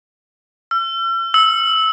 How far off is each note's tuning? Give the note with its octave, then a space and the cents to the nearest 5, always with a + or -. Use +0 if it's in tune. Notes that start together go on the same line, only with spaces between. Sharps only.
E6 +45
E6 -20